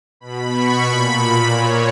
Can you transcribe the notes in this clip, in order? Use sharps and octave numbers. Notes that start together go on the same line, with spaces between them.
B2 B5
C#6
A#2 B5
B5
A#2 C#5